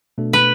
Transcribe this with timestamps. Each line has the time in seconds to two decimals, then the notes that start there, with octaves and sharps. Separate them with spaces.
0.18 B2 A3 D4 A4
0.33 B4